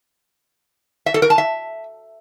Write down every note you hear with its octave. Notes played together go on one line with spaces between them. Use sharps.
E5
A4
A#4
A5
E5